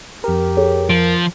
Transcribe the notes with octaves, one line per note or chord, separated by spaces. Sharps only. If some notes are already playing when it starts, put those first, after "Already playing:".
F2 G4 A#4
G#4 A4 C#5
F3 D7